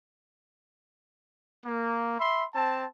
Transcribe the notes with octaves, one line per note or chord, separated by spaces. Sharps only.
A#3
E5 B5 C6
C4 A5